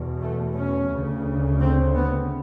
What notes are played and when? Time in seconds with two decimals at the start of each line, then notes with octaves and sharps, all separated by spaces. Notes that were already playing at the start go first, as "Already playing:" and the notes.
Already playing: E2 B2
0.21 A3
0.55 C#4
0.90 D2 C#3
1.60 C4
1.95 B3